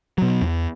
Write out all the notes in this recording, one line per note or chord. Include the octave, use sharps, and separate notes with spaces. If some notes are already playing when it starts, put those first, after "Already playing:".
B2 F#3
E2